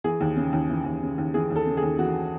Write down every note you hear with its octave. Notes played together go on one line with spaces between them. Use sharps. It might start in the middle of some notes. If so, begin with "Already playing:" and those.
E3 G#4
D#2
C#3
D#2
E3
D#2
C#3
D#2
E3 G#4
D#2
A4
C#3
G#4
D#2
E3 F#4